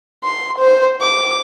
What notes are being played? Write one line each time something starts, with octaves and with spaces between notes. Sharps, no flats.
C6
C5
D6